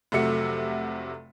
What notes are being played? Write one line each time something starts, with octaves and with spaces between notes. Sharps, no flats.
F1 C3 F#3 A3 E5 C#7